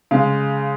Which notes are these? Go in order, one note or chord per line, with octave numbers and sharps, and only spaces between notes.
C#3 G#3 F5